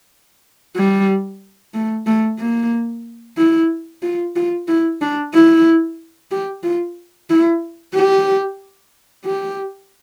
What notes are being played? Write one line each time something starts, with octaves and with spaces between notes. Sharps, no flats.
G3
A3
A3
A#3
E4
F4
F4
E4
D4
E4
G4
F4
E4
G4
G4